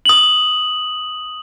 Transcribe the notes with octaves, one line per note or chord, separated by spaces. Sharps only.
D#6 F#7